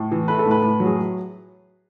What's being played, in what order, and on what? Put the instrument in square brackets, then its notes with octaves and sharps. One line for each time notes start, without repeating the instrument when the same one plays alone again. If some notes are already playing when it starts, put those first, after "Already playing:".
Already playing: [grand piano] A2
E3
A3 B4
A4
A2
B4
A2
F#3
G#4